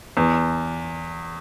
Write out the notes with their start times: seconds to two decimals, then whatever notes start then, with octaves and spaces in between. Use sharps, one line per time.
0.17 E2